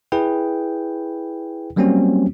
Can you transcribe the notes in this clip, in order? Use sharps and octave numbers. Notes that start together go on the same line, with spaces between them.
E4 G#4 B4 G5
F#3 G3 A#3 C4 C#4 F#4